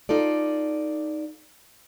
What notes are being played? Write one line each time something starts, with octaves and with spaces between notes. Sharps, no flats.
D#4 F4 A4 D5